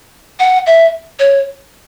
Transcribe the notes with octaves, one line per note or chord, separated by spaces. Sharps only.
F#5
E5
C#5